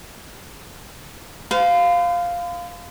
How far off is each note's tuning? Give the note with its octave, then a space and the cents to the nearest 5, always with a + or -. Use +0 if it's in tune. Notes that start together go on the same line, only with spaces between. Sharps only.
C5 -45 F5 +0